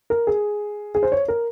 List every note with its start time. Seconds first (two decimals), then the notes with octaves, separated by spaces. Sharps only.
0.10 A#4
0.27 G#4
0.95 G#4
1.03 C5
1.12 C#5
1.28 A#4